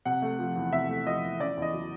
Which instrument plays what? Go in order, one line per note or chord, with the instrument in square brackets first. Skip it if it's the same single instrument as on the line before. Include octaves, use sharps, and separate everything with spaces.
[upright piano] C3 F#5
A3
F3
E2
C3 E5
A3
F3 D#5
E2
C#3 D5
E2
D#5
F#3